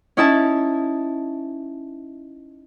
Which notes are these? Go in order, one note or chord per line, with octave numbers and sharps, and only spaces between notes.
C#4 D#4 E4 E5 A5